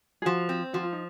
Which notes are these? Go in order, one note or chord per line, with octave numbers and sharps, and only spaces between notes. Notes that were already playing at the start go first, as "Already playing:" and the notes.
G#4
F3 F#4
C4
F3 F#4
F4
D#4